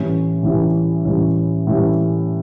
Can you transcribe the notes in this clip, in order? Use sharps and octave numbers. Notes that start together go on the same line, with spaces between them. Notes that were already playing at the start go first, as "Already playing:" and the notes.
Already playing: A2 E3 G3 C#4
A2 E3 G3 C#4
A2 E3 G3 C#4
A2 E3 G3 C#4